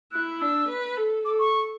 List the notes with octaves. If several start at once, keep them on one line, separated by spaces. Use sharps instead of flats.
E4 F#6
D4 E6
B4
A4
A4 D6
C#6